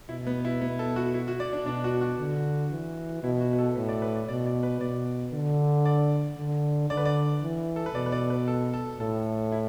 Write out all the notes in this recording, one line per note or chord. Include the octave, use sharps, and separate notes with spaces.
B2 E4
B3
E4
B3
A4
F#4
E4
F#4
D5
D4
B2 D4
F#4
F#4
D3
E3
B2 E4
F#4
B4
A4
A2 B4
D5
B4
D5
B2 D5
D5
B4
B2 D5
D3
D5
D3
D3 D5
B4
D5
E3
A4
B4
B2 D5
B4
D5
B4
A4
A4
A2 A4
E4